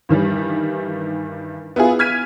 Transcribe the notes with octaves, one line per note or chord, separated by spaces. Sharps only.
G2 D#3 E3 G3
B3 E4 F4 G#4
F6 G#6 B6 D#7